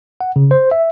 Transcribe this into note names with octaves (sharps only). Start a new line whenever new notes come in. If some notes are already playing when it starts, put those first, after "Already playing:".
F#5
C#3
C5
E5